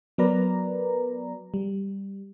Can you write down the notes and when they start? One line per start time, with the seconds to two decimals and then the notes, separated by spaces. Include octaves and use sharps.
0.18 F#3 B3 A#4 B4 D5 A#5
1.54 G3